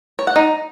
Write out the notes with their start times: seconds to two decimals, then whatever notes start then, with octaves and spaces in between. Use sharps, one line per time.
0.19 C#5
0.27 F#5
0.36 D#4